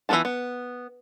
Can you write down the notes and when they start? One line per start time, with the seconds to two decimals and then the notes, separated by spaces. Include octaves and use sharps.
0.09 E3 F#3 B3 F4 A5
0.25 B3